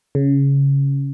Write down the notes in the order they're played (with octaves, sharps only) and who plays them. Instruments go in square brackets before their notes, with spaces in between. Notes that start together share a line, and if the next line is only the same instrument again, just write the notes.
[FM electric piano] C#3